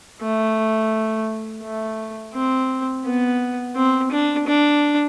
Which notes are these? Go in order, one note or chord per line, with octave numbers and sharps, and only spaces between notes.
A3
A3
C4
B3
C4
D4
D4